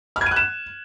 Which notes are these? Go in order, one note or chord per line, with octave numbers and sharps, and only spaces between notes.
F6
G#6
D#7
F#6
E7